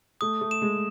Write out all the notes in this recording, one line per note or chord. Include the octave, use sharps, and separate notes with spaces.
A3 D#6
A3
E7
G#3